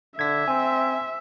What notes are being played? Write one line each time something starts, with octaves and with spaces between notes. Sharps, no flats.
D3 E5 G#6 B6
C4 G#5